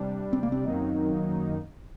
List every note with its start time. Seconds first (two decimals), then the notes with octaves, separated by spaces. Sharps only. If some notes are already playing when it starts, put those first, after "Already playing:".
Already playing: C3 G3 D4
0.33 C4
0.43 A#3
0.52 C4
0.64 F#2 D#3 F#3 A#3 D#4